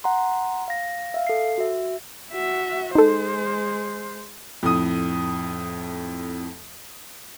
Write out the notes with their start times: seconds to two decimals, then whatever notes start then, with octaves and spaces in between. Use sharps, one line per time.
0.04 F#5 A#5 C6
0.68 F5 A#6
1.14 E5 F5
1.27 A4 C7
1.58 F#4 E5
2.32 F#4 E5
2.95 G#3 D#4 A4 C5
4.63 F2 A2 D#6